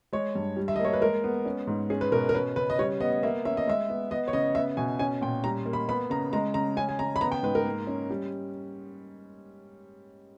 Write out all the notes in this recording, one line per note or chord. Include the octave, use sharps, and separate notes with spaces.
G#3 C#5
G2
G3
E5
D#5
A#3
C#5
B4
G#3 A#4
B3
C#4
G#2
C#4 G#4
B4
B2 A#4
A#4
C#4 B4
C#3 B4
D#5
G3 C#5
B3 D#5
A#3 E5
C#4 E5
D#5
G#3 E5
B3
B3 D#5
C#5
C#3 D#5
B3 E5
B2 G#5
C#4 G#5
A#2 G5
G3 A#5
A#3
B5
B3 B5
C#3 A#5
G#3 A#5
C#3 A#5
C#4 G#5
G#5
C#3 A#5
B5
B3 A#5
G5
G#2 B4
A#4
A#3
C#4
G3